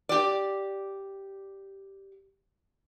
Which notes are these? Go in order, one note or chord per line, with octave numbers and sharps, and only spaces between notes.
G4 D5